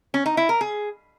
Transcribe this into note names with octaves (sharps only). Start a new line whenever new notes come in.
C#4
D#4
E4
A#4
G#4